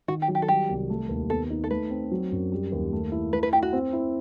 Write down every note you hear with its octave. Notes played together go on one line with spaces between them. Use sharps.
D#3 F#4
G4
F#3
G4
A4
G3 G4
C2
A3
D#2
B3 A4
D#4
A4
A3 B4
C4
F#3
F#2
G3
D#2
A3
E4
A3 B4
B4
E4 G4
F#4
C4
E4